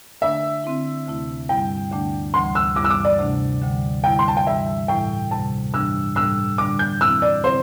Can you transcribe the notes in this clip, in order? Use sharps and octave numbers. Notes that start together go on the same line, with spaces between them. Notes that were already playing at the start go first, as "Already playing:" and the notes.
D3 A3 D4 E5
D3 C4 E4
D2 C3 A3 E4
G2 G3 E4 G5
D2 D3 A3 D4
D2 C3 E3 G3 C6
E6
G2 E3 G3 E4 D6
E6
D6
D5
D2 C3 A3 D4
D2 D3 G3
D3 G3 E4 G5
C6
A5
G5
G2 E3 G3 E5
A2 E3 G3 E4 G5
D2 C3 G3 A5
G2 E3 G3 D4 E6
A2 G3 D4 E6
D3 G3 D4 D6
G6
E2 E3 C4 E4 E6
D5
D3 C4 E4 C5